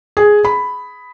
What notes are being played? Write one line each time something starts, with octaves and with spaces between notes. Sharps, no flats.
G#4
B5